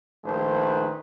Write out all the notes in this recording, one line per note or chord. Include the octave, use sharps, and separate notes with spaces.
A#1 D#3 A3 D#4 B4 C5